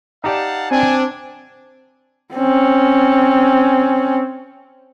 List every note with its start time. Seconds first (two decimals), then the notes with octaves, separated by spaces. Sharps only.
0.24 D#4 G4 D5 F5 F#5 A5
0.71 C4 D4 G#5
2.34 C4 C#4